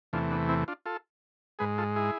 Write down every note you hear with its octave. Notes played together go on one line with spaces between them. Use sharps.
E2 C3 E3 A3 D4 F4
B3 D4
C4 E4
D4 F4
F4 A4
G#2 G#3 G#4 B4
F4 A4
E4 G#4